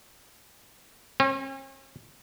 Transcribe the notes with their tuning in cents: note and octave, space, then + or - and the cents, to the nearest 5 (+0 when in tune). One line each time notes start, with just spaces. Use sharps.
C#4 -45